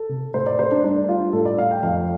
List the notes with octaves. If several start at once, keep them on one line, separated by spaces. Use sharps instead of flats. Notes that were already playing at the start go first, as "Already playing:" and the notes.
Already playing: A4
C3
A2 C5
D5
A3 C5
D4
G2 D4
G3 F4
A2 A4
D5
A3 F5
G5
F2 F5